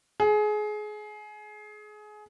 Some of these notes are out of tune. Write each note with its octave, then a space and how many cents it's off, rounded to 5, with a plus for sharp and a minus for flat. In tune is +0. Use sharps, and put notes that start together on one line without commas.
G#4 +25